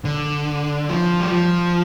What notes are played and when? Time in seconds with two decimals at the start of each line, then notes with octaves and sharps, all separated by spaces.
0.05 D3
0.89 F3
1.20 G3
1.31 F3